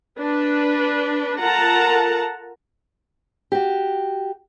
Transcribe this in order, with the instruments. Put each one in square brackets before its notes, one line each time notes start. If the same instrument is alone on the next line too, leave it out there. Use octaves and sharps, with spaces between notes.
[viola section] D4 B4
F4 A4 A#4 F#5 A5 A#5
[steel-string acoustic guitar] F#4 G4